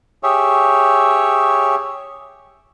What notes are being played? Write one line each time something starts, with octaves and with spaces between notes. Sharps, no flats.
G4 G#4 C#5 E5